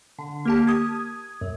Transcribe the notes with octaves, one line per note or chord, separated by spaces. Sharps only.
D3
A#3 G4 A5
D#6 G#6
F#2